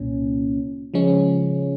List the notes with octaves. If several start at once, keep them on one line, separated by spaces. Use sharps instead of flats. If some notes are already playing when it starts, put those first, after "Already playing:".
Already playing: C2 A#2 C#4
C#3 F3 G#3 C#4